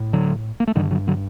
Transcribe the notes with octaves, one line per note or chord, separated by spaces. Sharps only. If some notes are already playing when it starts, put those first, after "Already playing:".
Already playing: A2
D3 F#3
A#3
A3
G2 D3 D#3 G3
D3 F#3
D3 F#3